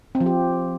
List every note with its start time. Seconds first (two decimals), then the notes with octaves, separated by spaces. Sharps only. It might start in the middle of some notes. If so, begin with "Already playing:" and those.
0.15 C4
0.21 F3
0.26 G4